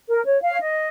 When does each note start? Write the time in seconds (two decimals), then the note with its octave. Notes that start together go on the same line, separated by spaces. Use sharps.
0.09 A#4
0.25 C#5
0.42 F5
0.50 C#5
0.59 D#5